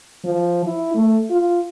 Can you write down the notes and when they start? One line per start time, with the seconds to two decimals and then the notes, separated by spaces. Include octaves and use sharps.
0.24 F3
0.66 E4
0.95 A3
1.31 F4